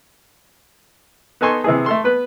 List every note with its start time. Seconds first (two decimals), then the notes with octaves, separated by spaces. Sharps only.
1.41 B3 D#4 A4 G#5 C6 C#6
1.64 C3 E3 G#4
1.86 A3 A4 C6
2.04 B3 B4